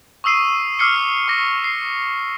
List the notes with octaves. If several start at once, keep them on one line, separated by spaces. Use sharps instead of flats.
C#6 D#6 E6 C7 D#7
D6 E6 F6 C7 C#7 G7
C#6 D6 A#6
C7